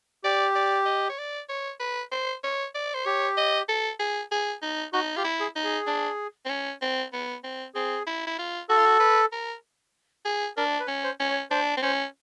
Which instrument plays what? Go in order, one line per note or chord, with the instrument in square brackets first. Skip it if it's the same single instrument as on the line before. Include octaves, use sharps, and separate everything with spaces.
[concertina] G4 [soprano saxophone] D5
[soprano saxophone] D5
D#5
C#5
D5
C#5
B4
C5
C#5
D5
C5
[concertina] G4 [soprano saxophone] C#5
[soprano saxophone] D#5
A4
G#4
G#4
D#4
[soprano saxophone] D#4 [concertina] F#4
[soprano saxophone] F4 [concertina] G4
[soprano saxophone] E4
[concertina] G#4
[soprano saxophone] D#4
[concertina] G#4
[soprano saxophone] D4
C4
C#4
C4
B3
C4
[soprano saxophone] C4 [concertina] G#4
[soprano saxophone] E4
E4
F4
[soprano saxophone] F#4 [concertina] A4
[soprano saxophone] F4
F#4
B4
A#4
G#4
[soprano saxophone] D4 [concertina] A#4
[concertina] B4
[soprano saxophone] C#4
[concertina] C5
[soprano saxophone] C#4
[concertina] C#5
[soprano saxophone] D4 [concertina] C5
[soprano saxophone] C4
[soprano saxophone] C#4 [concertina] C5